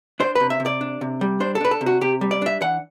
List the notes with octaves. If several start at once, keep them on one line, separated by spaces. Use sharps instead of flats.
D4 C5
C3 B4
E5
C3
D5
D4
C3
G3
D4 C5
A4
D4 B4
A4
C3
F#4
C3 G4
G3
D5
D4 E5
E3 F#5